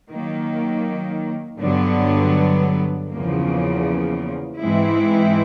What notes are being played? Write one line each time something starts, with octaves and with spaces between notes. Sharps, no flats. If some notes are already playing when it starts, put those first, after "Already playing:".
D#3 F#3 A#3
G2 D3 F#3 B3
E2 C#3 F3 A#3
G#2 E3 G#3 C4 E4